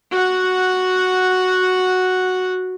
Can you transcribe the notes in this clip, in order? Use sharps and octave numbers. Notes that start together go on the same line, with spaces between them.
F#4 F#5